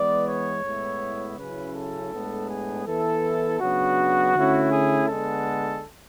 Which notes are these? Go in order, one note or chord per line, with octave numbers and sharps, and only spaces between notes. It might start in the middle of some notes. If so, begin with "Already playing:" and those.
Already playing: E3 G#3 B3 D5
C#5
A2 G#3 B3 E4
C#3 F#3 C#4 E4 B4
A4
A2 G#3 B3 D4
G#4
E3 B3 E4 A4
C#3 F#3 B3 D4 F#4
D3 A3 C#4 E4
G#4
D3 G#3 B3 A4